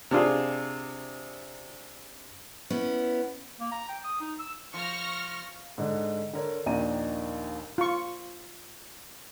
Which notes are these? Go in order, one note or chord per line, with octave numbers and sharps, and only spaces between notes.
C3 D4 F4 G#4
B3 C#4 E4
A#3
A#5
G5
D#6
D#4
E6
F3 C#6 F6 A#6
G#2 D3
D3 A#4 C#5
A#1 D#2 D#3 D4 A#5 D#7
F4 C#6